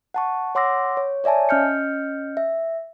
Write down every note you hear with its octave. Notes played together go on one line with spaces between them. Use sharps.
F#5 A5 C#6
C#5 F#5 C6 D6 E6 A#6
C#5
C#5 D5 E5 G#5 A5
C#4 D#5 F6 G6 C#7
E5